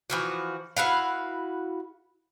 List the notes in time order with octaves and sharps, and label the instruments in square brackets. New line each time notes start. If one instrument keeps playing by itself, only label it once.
[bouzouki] E3 F3 F#4
E4 F#4 B4 F5